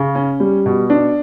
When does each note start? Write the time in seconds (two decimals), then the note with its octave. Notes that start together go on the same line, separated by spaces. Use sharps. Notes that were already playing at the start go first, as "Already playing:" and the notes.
Already playing: C#3
0.15 C#4
0.40 G3
0.66 B2
0.90 D4